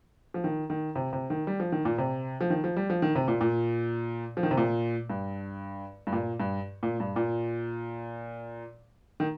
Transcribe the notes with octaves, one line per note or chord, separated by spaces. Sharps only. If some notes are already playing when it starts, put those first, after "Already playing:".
F3
D#3
D#3
C3
C3
D#3
G3
F3
D#3
A#2
C3
F3
D#3
F3
G3
F3
D#3
C3
A#2
A#2
F3
D#3
C3
A#2
G2
G2
A#2
G2
A#2
G2
A#2
D#3